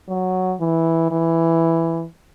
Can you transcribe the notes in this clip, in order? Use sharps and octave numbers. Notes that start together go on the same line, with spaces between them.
F#3
E3
E3